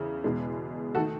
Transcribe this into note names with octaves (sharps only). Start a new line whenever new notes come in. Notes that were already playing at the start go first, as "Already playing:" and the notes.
Already playing: E2 C#3 E4
E2 B2 G#3
D#3 A3 F#4 A4